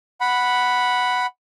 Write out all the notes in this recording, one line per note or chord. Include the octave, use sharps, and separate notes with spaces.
F#5 B5